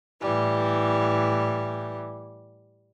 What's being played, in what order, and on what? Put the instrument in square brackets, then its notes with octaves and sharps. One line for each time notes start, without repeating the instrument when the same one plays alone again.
[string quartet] A2 E3 G3